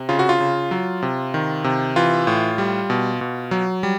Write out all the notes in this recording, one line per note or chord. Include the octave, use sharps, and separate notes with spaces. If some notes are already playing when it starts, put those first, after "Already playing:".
Already playing: C3
C#3 F4
F#4
F4
C#3
F#3
C3
D#3
C3
E3 F4
A2
G3
B2
B2
F#3
G3